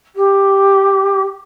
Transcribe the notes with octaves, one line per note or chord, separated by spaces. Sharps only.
G4